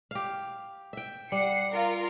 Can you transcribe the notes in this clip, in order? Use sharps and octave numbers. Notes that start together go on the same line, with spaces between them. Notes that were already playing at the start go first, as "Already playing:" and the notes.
G4 F5
E5 G5
G3 F#5 C7 C#7
F4 A#4